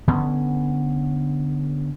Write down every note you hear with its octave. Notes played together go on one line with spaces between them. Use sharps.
D3 B3 C#4